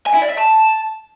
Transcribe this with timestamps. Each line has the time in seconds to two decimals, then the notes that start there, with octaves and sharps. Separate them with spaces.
0.06 G#5
0.14 E4
0.22 D5
0.30 E5
0.38 A5